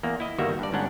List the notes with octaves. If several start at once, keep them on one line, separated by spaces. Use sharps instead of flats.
E2 A#3
E4 D#5
G1 D#3 G3 A#3 F#4 E5
G2 D5
G1 G#2 C#4 D4 F#5